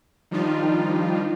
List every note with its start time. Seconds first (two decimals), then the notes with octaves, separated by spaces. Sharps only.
0.31 D#3 F3 G3 D4 D#4 F4